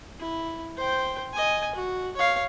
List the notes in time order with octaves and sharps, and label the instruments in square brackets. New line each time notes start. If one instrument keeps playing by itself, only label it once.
[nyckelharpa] E4
C5 G5
D#5 G#5
F#4
C#5 F5